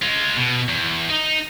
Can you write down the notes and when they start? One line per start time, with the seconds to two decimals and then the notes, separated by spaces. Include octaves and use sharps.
0.02 G#3 F4
0.37 B2
0.69 E2
1.10 D#4